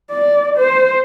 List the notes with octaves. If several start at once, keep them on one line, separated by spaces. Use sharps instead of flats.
D5
C5